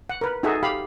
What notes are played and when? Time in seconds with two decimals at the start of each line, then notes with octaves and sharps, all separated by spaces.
0.09 F#5
0.21 A#4 B4
0.43 D#4 F#4 G#4 A4 E5
0.63 G4 F5 B5